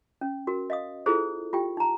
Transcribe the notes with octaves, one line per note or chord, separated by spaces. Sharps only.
C#4
F#4 A#4
D#5 F5 D#6
E4 F4 G#4 A4 C5
F4 G4 G5
D#4 A#5